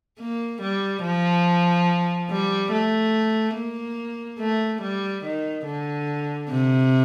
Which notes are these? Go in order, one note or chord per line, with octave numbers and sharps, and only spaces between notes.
A#3
G3
F3
G3
A3
A#3
A3
G3
D#3
D3
C3